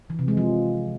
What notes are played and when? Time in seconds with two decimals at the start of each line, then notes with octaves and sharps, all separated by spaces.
0.10 E3
0.19 C3
0.28 G#3
0.37 F3